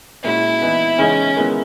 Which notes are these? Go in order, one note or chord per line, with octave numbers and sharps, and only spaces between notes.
A#2 G#3 C#4 E4 F#4
E3 B3 D#4
C#3 E3 G#3 C#4 D#4
D#3 G#3 B3 E4